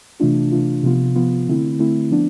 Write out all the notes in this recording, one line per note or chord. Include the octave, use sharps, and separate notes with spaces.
C3 E3 A3 D4 F4
C3 E3 A3 D4 F4
C3 F3 B3 F4
C3 F3 B3 F4
D3 A3 C4 E4
D3 A3 C4 E4
F3 B3 D4